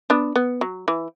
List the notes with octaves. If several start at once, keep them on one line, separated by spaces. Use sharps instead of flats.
B3 D4
B3
F#3
E3